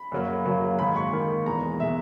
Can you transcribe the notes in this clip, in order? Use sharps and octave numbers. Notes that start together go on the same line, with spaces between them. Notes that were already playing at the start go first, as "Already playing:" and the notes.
Already playing: B5
F#2 C#3 F#3 A#3
F#2 C#3 F#3 A#3
G#2 D#3 A#3 B5
C#6
G#2 D#3 A#3
E2 B2 G#3 A#5
B2 G#3 E5